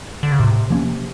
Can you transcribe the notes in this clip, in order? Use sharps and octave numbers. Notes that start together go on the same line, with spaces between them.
D3
C#3
A2 C3
F3 A#3 C#4